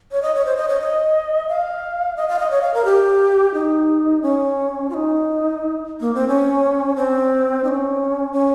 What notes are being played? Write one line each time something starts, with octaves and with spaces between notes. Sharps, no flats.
C#5
D#5
C#5
C5
D#5
C#5
D#5
F5
D#5
F5
D#5
C#5
F5
A#4
G4
D#4
C#4
F4
D#4
A#3
C4
C#4
C4
D#4
C#4
C#4